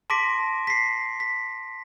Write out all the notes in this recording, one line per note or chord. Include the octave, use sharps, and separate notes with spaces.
A5 C6 D6 A#6 B6 D7
B6 C7
B6